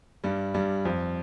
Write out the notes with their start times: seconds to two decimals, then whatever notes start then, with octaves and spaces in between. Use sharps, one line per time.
0.24 G2 G3
0.54 G2 G3
0.85 F2 F3